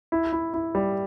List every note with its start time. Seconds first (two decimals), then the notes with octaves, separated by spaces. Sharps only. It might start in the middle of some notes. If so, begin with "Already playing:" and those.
0.12 E4
0.32 E4
0.54 E4
0.75 G3